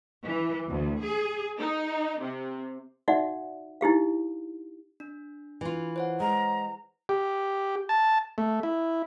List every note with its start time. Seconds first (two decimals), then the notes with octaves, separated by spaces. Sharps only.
0.24 E3
0.70 D2
1.04 G#4
1.58 D#4
2.20 C3
3.08 D#4 F#4 D5 E5 F#5
3.81 D#4 E4 G4 F5
5.00 D4
5.61 E3 F4
5.96 C5 C#5 F#5
6.20 G#3 A#5
7.09 G4
7.89 A5
8.38 A3
8.63 E4